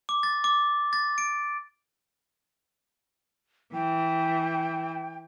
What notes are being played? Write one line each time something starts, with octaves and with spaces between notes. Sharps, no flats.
D6
A6
D6
A6
D7
E3 G5